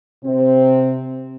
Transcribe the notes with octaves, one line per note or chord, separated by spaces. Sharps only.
C3 C4